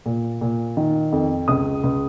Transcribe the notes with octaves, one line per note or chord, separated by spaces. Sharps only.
A#2
A#2
D#3
F2
C#2 D#6
C#2